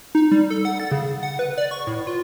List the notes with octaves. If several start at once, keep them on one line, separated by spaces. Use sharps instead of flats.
D#4
G3
A4
F#5
A6
C#3
F#5
B4
D5
C#6
A2
F4